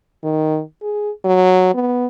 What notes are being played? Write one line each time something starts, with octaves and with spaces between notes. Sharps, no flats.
D#3
G#4
F#3
B3